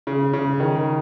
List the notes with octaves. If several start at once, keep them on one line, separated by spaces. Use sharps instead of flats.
C#3
C#3
D#3